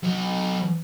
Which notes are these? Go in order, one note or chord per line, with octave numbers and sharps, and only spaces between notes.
F#3 D#5